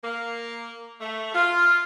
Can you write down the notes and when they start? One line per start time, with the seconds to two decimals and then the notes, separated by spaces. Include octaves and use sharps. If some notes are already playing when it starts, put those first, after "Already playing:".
0.04 A#3
1.01 A3
1.34 F4